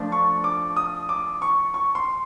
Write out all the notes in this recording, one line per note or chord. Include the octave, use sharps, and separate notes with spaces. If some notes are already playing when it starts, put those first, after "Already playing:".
Already playing: F3 A3 D4 F4
C#6
D6
D#6
D6
C#6
C#6
C6